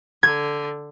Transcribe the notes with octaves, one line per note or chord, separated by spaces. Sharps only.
D3 G#6